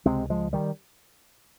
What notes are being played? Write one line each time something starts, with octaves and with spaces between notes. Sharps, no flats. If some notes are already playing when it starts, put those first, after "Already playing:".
C#2 C3 G#3 C4
F3 G#3
D#3 G3